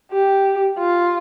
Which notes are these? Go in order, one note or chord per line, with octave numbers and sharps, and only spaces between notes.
G4
F4